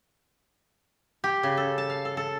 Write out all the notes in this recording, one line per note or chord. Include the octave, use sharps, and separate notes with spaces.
G4
C#3
A4
A5
F5
A4
A4